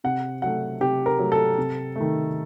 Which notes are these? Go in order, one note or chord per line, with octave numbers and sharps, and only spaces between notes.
C3 F#5
F#3 A3 F#5
C3 G4
A#4
F#3 A3
A4
C3
D#3 A3